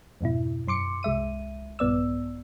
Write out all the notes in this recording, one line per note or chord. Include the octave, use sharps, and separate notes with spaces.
F2 G#2 B2 E4
F#2 C6 D6 C#7
C2 G#3 E5 D#7
A#1 G2 B3 D5 E6